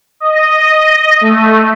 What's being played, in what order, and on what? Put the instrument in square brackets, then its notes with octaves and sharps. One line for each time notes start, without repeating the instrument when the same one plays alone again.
[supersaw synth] D#5
A3